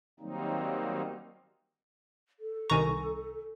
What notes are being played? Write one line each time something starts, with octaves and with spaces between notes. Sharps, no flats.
D#3 F#3 G3 A#3 C4 D#4
A4
C2 D#3 G#5 A#5 C#6